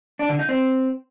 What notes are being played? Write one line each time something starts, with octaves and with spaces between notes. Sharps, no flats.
D4
D3
D#4
C4